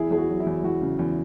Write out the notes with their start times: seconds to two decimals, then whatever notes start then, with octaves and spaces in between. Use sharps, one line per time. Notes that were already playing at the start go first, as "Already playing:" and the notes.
Already playing: E2 E4 G#4
0.11 E2 G#4
0.17 F#4
0.29 F#3
0.40 E4
0.46 E2
0.64 E2 F#4
0.81 C#3
0.99 E2